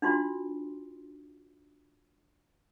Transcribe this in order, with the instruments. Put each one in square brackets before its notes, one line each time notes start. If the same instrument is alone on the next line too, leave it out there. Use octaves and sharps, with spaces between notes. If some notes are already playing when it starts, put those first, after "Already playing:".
[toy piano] D4 D#4 F4 F#4 C6